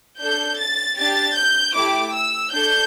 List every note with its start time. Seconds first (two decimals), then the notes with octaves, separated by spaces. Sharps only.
0.20 D4 A4 G6
0.59 A6
0.98 D4 G4 A6
1.36 G6
1.75 A3 E4 G4 D6
2.14 E6
2.52 D4 A4 G6